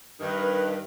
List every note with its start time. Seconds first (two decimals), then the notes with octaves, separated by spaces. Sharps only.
0.21 G2 D#3 B4